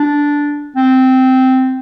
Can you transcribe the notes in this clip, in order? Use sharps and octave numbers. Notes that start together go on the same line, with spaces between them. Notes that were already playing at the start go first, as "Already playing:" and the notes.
Already playing: D4
C4